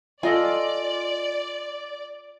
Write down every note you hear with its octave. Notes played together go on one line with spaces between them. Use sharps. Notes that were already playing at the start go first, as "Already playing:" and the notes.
F4 A4 D5 D#5 G#5